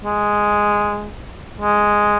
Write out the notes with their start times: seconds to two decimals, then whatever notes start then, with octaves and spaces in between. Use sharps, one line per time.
0.04 G#3
1.61 G#3